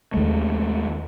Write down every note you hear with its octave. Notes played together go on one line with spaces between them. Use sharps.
D#2 G#3 A3